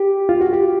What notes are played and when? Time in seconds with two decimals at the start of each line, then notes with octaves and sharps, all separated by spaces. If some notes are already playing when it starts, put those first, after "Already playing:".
Already playing: G4
0.29 F4
0.41 F#4
0.53 G4